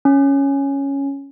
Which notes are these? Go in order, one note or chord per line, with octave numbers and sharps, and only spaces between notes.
C#4